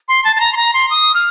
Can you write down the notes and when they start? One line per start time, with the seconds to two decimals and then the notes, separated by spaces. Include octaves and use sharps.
0.08 C6
0.25 A5
0.36 A5
0.40 A#5
0.53 C6
0.57 A#5
0.74 C6
0.90 D#6
1.14 F6